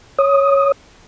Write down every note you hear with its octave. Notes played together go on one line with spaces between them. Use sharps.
C#5 D#6